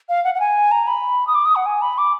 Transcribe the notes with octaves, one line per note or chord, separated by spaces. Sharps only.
F5
F#5
F#5
G#5
A#5
B5
D#6
D6
D#6
F#5
G#5
B5
D6